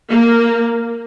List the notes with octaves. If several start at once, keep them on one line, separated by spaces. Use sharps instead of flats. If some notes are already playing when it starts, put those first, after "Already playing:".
A#3